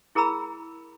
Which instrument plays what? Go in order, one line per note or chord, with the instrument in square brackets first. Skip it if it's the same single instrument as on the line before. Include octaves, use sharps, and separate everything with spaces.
[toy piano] E4 G#4 A#4 A#5 B5 E6